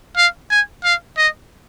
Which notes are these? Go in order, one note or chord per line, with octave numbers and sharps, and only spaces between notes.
F5
G#5
F5
D#5